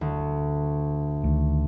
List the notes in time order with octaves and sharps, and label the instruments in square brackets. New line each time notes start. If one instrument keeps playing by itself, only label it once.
[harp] D2
[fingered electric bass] D2 D#3